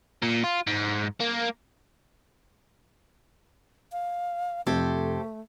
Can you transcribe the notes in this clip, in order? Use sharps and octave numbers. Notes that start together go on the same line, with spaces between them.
A#2
F4
G#2
A#3
F5
F2 C3 A3 G4 A4 C5 G#6